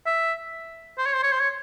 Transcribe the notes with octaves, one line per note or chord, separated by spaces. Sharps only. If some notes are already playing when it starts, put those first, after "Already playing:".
E5
C5
C#5
C5
C#5
C5
C#5